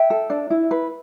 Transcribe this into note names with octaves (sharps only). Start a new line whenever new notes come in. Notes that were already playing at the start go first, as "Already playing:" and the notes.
Already playing: E5 G5
A4
D4
E4
B4